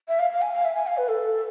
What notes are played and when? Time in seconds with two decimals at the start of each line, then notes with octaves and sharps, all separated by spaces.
0.08 E5
0.19 F5
0.30 F5
0.42 G#5
0.53 F5
0.65 E5
0.75 G#5
0.87 F5
0.97 B4
1.08 A4